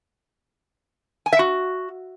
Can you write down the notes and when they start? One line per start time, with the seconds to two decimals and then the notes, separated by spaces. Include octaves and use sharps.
1.26 G#5
1.33 E5
1.39 F#4